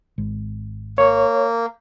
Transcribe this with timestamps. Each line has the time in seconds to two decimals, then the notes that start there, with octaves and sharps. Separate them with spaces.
0.18 G#1
0.98 A#3 C#5